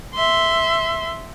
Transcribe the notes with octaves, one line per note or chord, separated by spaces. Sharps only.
E5 C6